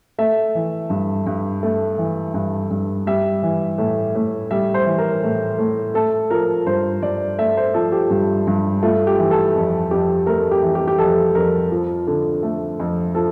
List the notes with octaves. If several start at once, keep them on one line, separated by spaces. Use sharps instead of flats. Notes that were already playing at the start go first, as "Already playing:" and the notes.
A3 E5
E3
G2
G2
A3
E3
G2
G2
G3 E5
E3
A2
A2
G3 E5
C5
E3
A#4
A2
A2
A3 A4
F3 A#4
G2 C5
G2 D5
A3 E5
C5
F3 A4
G4
G2
G2
A3 F4
G4
E3
A4
F2
F2 G4
A3 A#4
G4
E3
G4
G4
F2 A4
F2 A#4
F3
D3
A3
F2
F3 A4